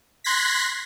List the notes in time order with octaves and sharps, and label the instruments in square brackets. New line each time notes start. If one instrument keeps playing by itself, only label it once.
[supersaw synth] C6 F#6 G#6 A#6 B6